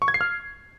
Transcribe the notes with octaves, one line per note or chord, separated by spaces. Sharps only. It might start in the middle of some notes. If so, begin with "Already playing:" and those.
C#6
G#6
C7
F6